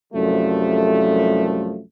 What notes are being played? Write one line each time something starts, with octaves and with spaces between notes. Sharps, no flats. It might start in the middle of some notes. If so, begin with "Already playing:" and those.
C2 F#2 F3 G3 A3